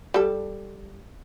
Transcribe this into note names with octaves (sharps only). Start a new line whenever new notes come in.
G3 A4